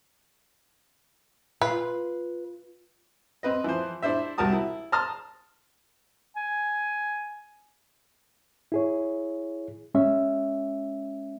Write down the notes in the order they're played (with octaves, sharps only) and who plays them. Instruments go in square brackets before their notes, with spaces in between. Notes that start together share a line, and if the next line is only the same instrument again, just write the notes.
[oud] F4 [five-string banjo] B4
[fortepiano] C4 B4 D#5
E3 F3 C5
D4 E4 C5 E5
C2 F#4 A#4 A5 D#6
E4
A5 A#5 C6 D#6 F6
[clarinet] G#5
[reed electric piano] E4 G#4 C#5
G#3 C#4 E5